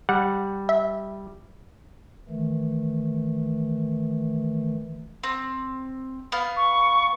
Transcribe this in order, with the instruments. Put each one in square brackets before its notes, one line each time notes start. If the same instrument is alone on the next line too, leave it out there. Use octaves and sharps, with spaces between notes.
[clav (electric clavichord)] G3 [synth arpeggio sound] F#5
[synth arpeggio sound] E5
[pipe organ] D#3 E3 A3
[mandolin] C4
B3 F5
[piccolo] C#6